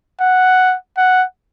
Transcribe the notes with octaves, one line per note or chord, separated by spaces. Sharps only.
F#5
F#5